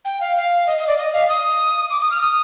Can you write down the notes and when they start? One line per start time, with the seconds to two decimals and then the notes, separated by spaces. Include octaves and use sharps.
0.05 G5
0.21 F5
0.36 F5
0.67 D#5
0.78 D#5
0.87 D5
0.98 D#5
1.13 F5
1.29 D#6
1.90 D6
2.00 D#6
2.11 F6
2.21 D#6